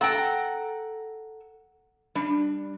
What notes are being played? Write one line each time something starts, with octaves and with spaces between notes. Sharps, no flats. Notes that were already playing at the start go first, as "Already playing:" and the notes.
A4 F#5 G5 A#5
G3 D4